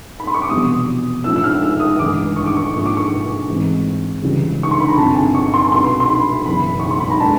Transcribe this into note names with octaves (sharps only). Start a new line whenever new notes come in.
B5
C6
C#6
D6
F1 E2 B2 G3 D#6
A2 F3 A3 C#4 E6
E6
F6
E6
D#6
A1 G2 D#3 G#3 D6
C#6
D6
C#6
G#2 F3 A#3 C#6
D6
C#6
A1 G#2 E3 G#3 C4
C#2 C#3 E3 G3
C#6
C6
B5
A#5
G1 F2 C3 A5
G#5
C#6
C6
C2 B2 F#3 B3 E4 C6
C6
B5
F#1 E2 B2 B5
C#6
C6
B5
A#5
G#3 B3 D4 A5